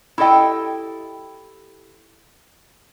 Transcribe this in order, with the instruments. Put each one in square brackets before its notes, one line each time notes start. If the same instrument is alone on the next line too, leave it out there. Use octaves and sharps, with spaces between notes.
[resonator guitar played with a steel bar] E4 G4 A4 D#5 G5